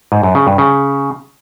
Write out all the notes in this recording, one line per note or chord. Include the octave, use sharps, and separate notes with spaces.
G#2
F#2
C#3
G2
C#3